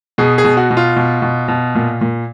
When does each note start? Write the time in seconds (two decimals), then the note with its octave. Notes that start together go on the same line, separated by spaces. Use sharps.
0.18 B2 G#4
0.38 G#4
0.44 B2
0.57 F#4
0.70 B2
0.77 F4
0.96 B2
1.22 B2
1.48 B2
1.75 A#2
2.01 A#2